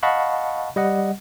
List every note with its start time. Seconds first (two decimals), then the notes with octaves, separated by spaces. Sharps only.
0.03 D#5 F5 F#5 A5 B5 C#6
0.76 G3 D#5 F#5